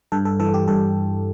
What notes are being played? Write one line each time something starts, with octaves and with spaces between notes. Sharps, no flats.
G2 A4
A4
E3 A4
G4
G2 A4